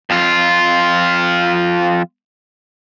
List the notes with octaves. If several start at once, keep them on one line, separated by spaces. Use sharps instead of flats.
F2 F4